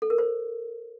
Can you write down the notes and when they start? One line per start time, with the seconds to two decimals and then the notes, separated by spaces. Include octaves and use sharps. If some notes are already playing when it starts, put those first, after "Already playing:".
0.02 A4
0.10 A#4
0.18 C5